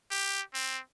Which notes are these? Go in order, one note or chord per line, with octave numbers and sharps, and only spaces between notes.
G4
C4